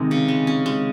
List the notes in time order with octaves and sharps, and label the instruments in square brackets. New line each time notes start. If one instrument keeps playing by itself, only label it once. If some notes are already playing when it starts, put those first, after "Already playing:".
Already playing: [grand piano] C3 D#3 [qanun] G#3
[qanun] C#3
G#3
C#4
G#3